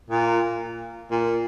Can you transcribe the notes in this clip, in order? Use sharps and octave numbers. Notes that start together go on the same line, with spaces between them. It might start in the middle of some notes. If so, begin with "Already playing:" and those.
A#2
A#2